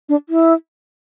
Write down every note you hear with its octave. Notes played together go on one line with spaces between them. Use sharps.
D4
E4